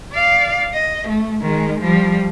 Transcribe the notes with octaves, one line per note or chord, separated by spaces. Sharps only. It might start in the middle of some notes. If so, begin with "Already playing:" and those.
D5 F5
D#5
A3
D#3 G#3
F3 G3